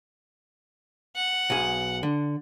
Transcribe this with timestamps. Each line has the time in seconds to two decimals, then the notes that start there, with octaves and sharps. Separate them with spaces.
1.16 F#5
1.50 B1 G#4
2.03 D3